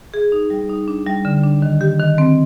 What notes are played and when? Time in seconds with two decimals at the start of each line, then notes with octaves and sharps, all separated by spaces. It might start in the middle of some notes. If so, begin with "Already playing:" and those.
0.14 G#4
0.32 D#4
0.50 G3
0.69 D#4
0.88 D4
1.07 G3
1.25 D3
1.43 D4
1.62 D#3
1.81 G4
2.00 D#3
2.18 C4